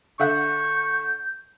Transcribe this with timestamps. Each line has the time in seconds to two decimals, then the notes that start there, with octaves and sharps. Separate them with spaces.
0.19 D3 E5 F#5 C#6 G6